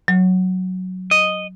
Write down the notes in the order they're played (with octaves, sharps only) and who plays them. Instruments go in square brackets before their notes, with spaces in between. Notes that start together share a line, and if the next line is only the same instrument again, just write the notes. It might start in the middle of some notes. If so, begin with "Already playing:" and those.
[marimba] F#3
[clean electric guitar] D#5